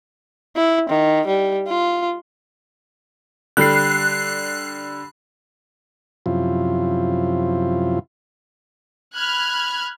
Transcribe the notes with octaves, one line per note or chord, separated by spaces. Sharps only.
E4
D#3
G3
F4
D3 G3 F#6 C7
F#2 C3 F3 E4 F4
B5 F6 F#6 G#6